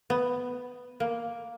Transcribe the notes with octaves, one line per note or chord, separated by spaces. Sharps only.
B3
A#3